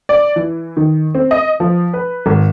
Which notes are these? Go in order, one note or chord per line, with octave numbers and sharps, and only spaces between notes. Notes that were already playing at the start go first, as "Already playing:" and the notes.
D5
E3
D#3
C4
D#5
F3
B4
G#1